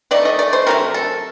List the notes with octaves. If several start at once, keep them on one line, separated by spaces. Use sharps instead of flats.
D#3 A3 D5
D#5
D5
C5
C3 F#3 A3 A#4
A4